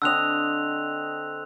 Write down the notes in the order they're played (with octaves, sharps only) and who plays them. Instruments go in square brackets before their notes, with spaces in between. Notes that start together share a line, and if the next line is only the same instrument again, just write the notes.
[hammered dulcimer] D3 C4 D#5 [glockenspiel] E6 F#6 F7